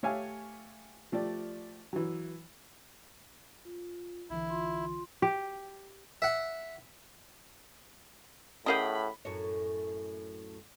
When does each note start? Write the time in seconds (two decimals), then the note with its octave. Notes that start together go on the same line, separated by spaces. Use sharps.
0.03 A3 G4 C#5 E5 F5 G#5
1.12 F3 A3 G4 D5
1.93 E3 F#3
3.65 F4
4.30 B1 D3 E3 E4
4.50 F4 C6
5.22 G4
6.22 E5 F#5
8.66 A2 C#4 G4 G#4 A#4 D#5 F#5 B5
9.25 F#2 A2 C#5